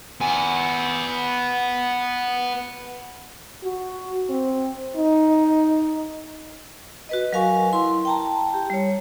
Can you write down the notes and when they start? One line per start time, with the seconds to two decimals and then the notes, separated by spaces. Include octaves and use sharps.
0.21 B3 G#5
3.64 F#4
4.29 C4
4.96 D#4
7.09 F#4 B4 D#5
7.33 F#3 A#4 F5 G#5 C#6
7.73 E4 C6
8.05 G5 A5 A#5
8.54 G4
8.70 G3 C#5